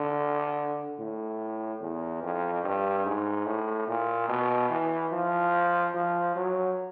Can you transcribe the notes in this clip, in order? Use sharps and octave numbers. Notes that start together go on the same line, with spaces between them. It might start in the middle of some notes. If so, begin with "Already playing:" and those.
Already playing: D3
A2
E2
F2
G2
G#2
A2
A#2
B2
E3
F3
F3
F#3